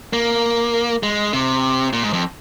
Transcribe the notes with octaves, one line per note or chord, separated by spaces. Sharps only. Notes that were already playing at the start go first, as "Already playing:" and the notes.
A#3
G#3
C3
A#2
G#2
F2